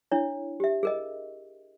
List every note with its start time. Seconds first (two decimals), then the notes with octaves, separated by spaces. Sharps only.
0.11 D4 E4 C#5
0.60 G4 E5
0.83 G#4 A#4 D#5